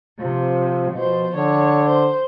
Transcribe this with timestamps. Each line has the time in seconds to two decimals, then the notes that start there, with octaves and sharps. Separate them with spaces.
0.19 C3 F3
0.92 B2 F3 C5
1.34 D3 C#5
1.88 C5